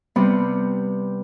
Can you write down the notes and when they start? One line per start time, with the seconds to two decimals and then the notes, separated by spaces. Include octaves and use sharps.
0.16 C3 G3 B3 C4